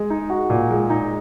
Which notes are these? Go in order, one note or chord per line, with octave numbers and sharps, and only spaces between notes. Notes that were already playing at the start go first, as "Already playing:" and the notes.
Already playing: G#3
D#4
F#4
A#2
G#3
D#4